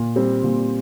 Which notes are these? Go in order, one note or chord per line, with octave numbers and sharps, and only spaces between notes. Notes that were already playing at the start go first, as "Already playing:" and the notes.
Already playing: A#2
G3 C4
A#2